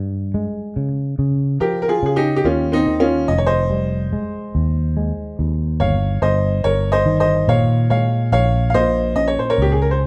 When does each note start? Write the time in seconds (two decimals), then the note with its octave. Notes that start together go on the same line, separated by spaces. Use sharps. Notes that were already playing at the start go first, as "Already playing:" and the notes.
Already playing: G2
0.34 G#3
0.76 C#3
1.19 C#3
1.60 F3 G4 A#4
1.82 A#4
1.88 F4 G#4
2.03 C#3 G#4
2.16 D#4 G4
2.36 G4
2.45 D#2 C#4 F4
2.72 C4 D#4
2.87 D#3
3.00 C#4 F4
3.28 F1 D#5
3.38 C#5
3.46 C5 D#5
3.70 G3
4.13 G#3
4.55 D#2
4.97 G#3
5.39 D#2
5.80 G1 C#5 F5
6.22 G1 C5 D#5
6.64 G1 A#4 C#5
6.92 C5 D#5
7.06 D#3
7.20 C5 D#5
7.48 A#2 C#5 F5
7.90 G#3 C#5 F5
8.32 A#1 C#5 F5
8.70 F5
8.74 A#2 C5 D#5
9.16 C#4 D#5
9.28 C#5
9.39 C5
9.50 A#4 C#5
9.58 C#2 G4
9.72 G#4
9.82 A#4
9.91 C5